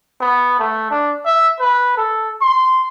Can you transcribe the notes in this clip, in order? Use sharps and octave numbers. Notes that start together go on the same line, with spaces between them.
B3
A3
D4
E5
B4
A4
C6